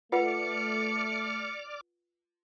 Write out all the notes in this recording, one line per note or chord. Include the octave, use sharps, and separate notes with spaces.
A3 F4 B4 D5 F#5 D6 F6 C#7